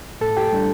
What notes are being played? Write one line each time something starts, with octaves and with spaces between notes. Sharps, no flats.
A2 A4 A5
G4 G5
G3 D4